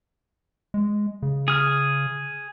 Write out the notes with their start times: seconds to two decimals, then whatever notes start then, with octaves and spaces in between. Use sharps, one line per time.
0.74 G#3
1.23 C#3
1.48 G#4 F6